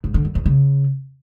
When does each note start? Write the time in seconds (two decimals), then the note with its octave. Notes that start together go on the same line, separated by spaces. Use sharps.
0.04 G#2
0.14 D3
0.25 F#2
0.35 E2
0.46 C#3